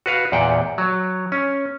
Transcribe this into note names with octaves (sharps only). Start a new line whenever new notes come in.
F#4 B4 F5
E2 A#2 F#5 G5
F#3
C#4